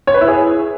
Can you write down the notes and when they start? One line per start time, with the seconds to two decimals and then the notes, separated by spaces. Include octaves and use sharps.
0.07 C#5
0.14 B4
0.21 E4
0.28 G#4